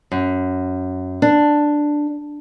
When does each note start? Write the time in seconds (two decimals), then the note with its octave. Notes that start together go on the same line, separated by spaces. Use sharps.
0.12 F#2
1.22 D4